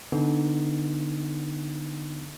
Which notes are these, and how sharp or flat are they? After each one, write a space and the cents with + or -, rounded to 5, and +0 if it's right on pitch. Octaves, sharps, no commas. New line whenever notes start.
D3 +0 B3 +0 D#4 +0